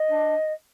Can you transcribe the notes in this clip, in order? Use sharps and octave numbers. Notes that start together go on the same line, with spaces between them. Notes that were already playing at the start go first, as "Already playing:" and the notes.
Already playing: D#5
D4